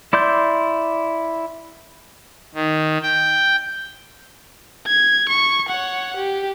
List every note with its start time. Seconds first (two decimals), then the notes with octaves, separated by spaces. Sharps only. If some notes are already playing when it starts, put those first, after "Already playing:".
0.13 E4 D5 C6 G6
2.54 D#3
3.02 G5
4.87 G#6
5.29 C#6
5.69 C#5 F#5
6.17 G4